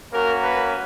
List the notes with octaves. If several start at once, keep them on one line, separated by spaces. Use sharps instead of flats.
A#3 C#4 F#4 A#4
B4